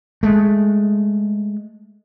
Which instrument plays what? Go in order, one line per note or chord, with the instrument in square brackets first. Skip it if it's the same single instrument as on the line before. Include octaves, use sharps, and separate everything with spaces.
[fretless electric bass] G#3 A3